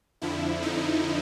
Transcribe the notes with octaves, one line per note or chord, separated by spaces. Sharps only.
F2 D3 F3 E4
D#4